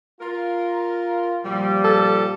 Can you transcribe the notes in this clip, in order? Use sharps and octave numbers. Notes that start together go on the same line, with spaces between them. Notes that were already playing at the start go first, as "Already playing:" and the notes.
F4 A#4
A#2 F3 G3
A4